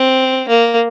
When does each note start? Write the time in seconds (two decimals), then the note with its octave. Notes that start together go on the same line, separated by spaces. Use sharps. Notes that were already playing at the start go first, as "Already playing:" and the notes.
Already playing: C4
0.49 A#3